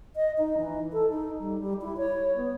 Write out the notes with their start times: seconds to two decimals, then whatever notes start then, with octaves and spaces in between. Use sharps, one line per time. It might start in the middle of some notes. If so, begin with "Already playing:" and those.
0.16 D#5
0.38 D#4
0.58 E3
0.93 A4
1.10 D#4
1.40 G3
1.61 G3
1.82 E4
1.97 C#5
2.36 B3